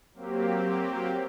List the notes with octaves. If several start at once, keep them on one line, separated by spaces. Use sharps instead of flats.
F#3 A#3 C4 G4